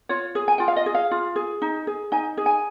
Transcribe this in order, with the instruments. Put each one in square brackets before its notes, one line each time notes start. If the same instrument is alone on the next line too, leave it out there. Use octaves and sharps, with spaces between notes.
[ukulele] F4 C#5
G#4
G#5
F4 G5
F5
D#5
G#4
F5
F4
G#4
D#4
G#4
D#4 G#5
G#4
G#5